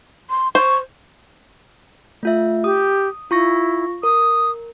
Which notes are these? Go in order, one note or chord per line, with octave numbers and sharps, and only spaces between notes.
C6
C5 C#6
A3 F4 E5
G4 D#6
E4 F4 C#6 A#6
A#4 D#6